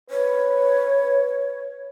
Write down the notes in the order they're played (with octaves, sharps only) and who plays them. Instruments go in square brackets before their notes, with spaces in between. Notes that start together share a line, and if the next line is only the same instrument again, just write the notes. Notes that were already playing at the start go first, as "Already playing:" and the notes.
[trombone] B4 [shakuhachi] C#5